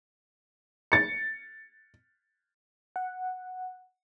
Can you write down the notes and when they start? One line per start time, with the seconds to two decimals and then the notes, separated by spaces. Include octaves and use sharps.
0.92 A6 C#7
2.96 F#5